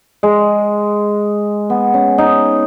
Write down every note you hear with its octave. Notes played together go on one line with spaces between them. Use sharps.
G#3
B3
C#4
D#4